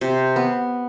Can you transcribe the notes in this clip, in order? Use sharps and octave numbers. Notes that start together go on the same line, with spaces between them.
C3
B3